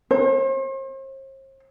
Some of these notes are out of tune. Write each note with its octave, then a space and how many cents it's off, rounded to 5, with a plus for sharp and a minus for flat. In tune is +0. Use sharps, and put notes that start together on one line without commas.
C5 +45